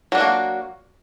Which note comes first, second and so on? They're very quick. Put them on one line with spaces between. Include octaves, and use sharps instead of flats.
F#3 D4 F#4 A#3